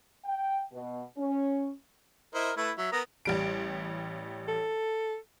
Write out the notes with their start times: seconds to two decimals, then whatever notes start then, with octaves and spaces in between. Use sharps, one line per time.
0.25 G5
0.72 B2
1.17 C#4
2.34 E4 A#4 C5 D#5
2.57 A3 E4 B4
2.78 F#3 E5
2.92 B3 A#4 A#5 D#6
3.25 A1 G3 D7
4.48 A4